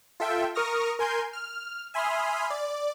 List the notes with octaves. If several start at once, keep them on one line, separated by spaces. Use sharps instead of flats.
F4 A4 E5 G5
A#4 C#6 D#6 F6 A#6
A#4 G#5 C6 G6
F6
E5 G#5 B5 C6 D#6 F6
D5